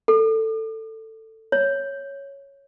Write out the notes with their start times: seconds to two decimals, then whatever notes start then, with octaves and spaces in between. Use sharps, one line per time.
0.08 A4
1.52 C#5